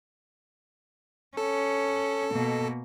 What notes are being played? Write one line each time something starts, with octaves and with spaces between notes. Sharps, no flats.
C#4 A4
B2 A#3